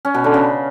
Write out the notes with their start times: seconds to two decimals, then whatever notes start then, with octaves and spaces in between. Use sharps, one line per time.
0.05 C#4
0.14 B2
0.24 D3
0.34 C#3